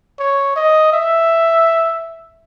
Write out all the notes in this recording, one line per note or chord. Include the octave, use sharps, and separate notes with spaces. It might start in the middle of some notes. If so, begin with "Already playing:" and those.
C#5
D#5
E5